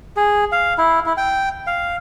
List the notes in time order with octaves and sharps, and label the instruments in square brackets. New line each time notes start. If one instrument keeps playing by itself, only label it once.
[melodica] G#4
F5
E4
E4
G5
F5